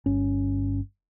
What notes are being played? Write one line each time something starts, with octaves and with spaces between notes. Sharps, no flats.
G1 C#4